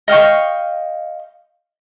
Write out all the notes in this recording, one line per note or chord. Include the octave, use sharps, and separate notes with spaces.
D#5 F5 G5 C#6